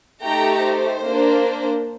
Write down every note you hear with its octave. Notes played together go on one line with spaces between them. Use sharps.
A3 D#4 G4 G5 A#5
C5
A#3 D4